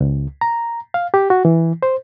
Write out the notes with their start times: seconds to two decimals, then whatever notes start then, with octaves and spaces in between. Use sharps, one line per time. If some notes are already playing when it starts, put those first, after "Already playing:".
0.01 C#2
0.41 A#5
0.94 F5
1.14 G4
1.30 F#4
1.45 E3
1.83 C5